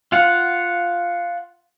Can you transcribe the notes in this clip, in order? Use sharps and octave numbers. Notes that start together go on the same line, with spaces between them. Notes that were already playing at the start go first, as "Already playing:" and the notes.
F4 F5 F#5